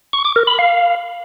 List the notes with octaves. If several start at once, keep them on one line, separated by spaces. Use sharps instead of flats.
C#6
D6
A#4
B5
F5